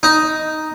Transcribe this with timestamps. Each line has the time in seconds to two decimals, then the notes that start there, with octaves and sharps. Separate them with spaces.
0.03 D#4